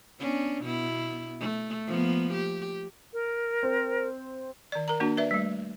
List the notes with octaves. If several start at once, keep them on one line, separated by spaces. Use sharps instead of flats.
B3 C#4 D4
B2 B3 E4
A3
F3 A#3 B3
G4
A#4
C4
D#3 D5
A#4 A#5
A#3 D4 F#4
B4 D5 E5
G3 A3